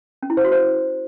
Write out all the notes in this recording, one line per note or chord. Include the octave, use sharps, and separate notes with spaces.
C#4
E4
C5
F#4
C5